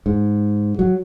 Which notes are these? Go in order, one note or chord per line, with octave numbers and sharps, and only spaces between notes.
G#2
F#3